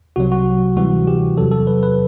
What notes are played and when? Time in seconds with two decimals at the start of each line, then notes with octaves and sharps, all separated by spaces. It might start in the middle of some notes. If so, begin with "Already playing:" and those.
0.16 C2 C3 F#3 F#4
0.32 F#4
0.76 D2 C3 E3 G3 F#4
1.07 G4
1.37 E2 C3 F#3 A4
1.51 A4
1.67 B4
1.83 B4